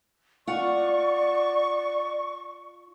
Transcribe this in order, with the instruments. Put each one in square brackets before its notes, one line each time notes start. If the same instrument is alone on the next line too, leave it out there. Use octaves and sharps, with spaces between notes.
[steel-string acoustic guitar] F4 F#5 [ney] D5 [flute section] C#6